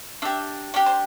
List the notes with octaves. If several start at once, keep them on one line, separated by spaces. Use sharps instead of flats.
D4 G4 E5
D4 G4 D5
C5